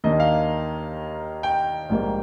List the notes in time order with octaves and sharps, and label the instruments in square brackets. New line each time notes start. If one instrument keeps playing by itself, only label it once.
[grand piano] D#2 D#3 A#3 D4 D#5
F5
G5
A#1 G#2 G3 A#3